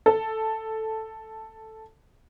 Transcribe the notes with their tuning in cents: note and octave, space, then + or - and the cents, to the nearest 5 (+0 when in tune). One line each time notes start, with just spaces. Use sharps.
A4 +5